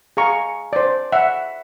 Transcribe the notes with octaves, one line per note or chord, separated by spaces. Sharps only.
G#4 F5 A#5 C#6
C5 D5
E5 F#5